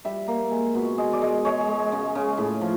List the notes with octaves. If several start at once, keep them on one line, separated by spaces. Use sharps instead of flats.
G3 E5
A#3
G#3
B2
G#3 D#5
D5
G#3 D#5
G#3 C#5
G#3
C#3
C#3
A2
F3